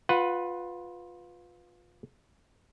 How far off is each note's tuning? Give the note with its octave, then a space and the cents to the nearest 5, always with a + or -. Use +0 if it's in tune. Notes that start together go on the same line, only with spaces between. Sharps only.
F4 +20 B4 +0 F#5 +0